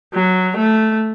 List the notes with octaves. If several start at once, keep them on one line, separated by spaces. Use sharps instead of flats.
F#3
A3